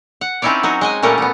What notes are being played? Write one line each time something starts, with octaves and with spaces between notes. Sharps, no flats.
F#5
C4 C#4 D#4 E4 C#5 D5
F#3 D#4 F#4
G#3 D#5 G#5
A#2 G3 A3 C#4 A#4 F#5
A3 B3